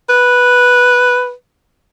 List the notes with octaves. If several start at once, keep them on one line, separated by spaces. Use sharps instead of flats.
B4